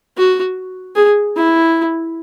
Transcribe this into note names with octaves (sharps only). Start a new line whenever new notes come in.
F#4
G#4
E4